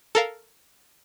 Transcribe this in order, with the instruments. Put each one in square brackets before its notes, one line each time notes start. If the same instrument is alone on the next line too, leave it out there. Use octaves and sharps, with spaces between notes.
[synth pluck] A4 A#4 F5